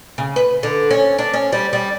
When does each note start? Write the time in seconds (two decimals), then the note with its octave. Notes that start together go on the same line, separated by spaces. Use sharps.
0.18 C#3
0.36 B4
0.63 D3
0.91 C#4
1.18 D4
1.34 C#4
1.52 G3
1.73 G3